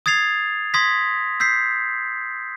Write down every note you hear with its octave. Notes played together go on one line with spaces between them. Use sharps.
D#6 G#6 A6 C7 F7
C6 D#6 G#6 A#6 B6
E6 G6 B6 C7